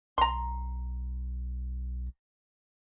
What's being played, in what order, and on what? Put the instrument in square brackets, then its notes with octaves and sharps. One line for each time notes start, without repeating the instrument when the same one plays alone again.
[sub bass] B1 [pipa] A#5 C6